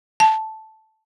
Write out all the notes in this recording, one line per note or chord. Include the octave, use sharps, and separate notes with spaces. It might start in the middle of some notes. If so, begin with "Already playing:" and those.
A5